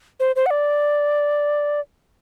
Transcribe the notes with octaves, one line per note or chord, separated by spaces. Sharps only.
C5
C5
F#5
D5